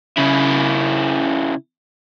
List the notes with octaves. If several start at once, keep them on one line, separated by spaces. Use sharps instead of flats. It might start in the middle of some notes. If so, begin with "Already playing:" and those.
C#3 E4